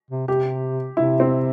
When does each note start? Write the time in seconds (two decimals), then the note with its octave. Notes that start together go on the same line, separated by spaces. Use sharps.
0.11 C3
0.28 C3 G4
0.97 C3 E4
1.20 C4